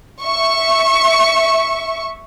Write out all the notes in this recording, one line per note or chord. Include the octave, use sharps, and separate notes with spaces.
E5 C#6